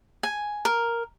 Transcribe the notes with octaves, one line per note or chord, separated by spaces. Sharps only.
G#5
A#4